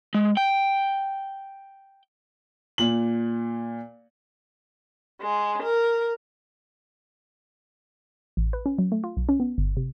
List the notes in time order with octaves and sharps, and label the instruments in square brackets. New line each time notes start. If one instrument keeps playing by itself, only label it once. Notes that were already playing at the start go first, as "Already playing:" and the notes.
[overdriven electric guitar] G#3
G5
[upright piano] A#2 F#7
[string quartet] G#3
A#4
[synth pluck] A1
B4
C#4
F#3
A3
F4
B1
C#4
B3
G1
C3